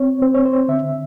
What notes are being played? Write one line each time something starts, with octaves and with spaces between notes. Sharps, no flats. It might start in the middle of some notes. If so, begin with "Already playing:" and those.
Already playing: C4 C#5
C4 C5
C#5
C5
D3 E5